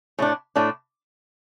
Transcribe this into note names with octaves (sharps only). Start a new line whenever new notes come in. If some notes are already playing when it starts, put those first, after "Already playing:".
A2 A3 D4
A2 A3 D4